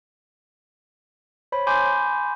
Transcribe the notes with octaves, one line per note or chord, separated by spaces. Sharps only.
C5 C#5 B5
G#5 B5 C6 D6 G6